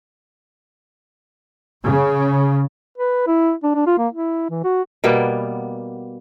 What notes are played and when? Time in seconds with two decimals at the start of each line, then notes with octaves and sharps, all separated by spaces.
1.85 C#3
2.98 B4
3.27 E4
3.63 D4
3.75 D4
3.86 F4
3.98 A#3
4.13 E4
4.50 E3
4.64 F#4
5.04 B2 G3 A#3 B3